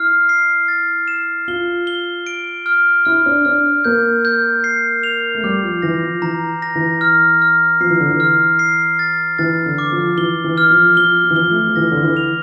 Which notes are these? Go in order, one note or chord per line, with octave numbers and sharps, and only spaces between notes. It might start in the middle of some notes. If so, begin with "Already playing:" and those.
Already playing: E4 F6 C7
C7
A6
E7
F4 G7
G7
D7
F6
E4 F6
D4
D4 F6
A#3 G6
G6
C7
F7
A3
G3 D6
F3
E3 A#6
F3
E3 A#5
A#6
E3
F6
F6
F3 C7
E3
D3
E3
F6
C7
A6
E3 A6
D3
D6
F3
E3 G7
E3
F6
F3
F3 G7
F3
E3
F3 G7
A3
F3
E3 A#6
D3
E3
F7